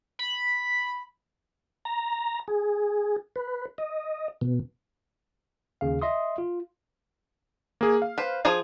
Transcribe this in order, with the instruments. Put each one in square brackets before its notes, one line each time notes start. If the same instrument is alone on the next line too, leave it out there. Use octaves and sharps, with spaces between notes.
[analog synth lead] B5
[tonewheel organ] A#5
G#4
B4
D#5
B2
[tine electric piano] D#2 C#3 F5
D#5 E5 C6 D#6
F4
[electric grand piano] A#3 G#4
F5
[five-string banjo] B4 C5
F3 G#4 G#5